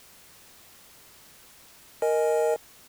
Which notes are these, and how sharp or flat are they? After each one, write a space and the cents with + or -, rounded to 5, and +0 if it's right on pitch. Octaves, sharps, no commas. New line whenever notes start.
A#4 +0 D#5 +0 G#5 +0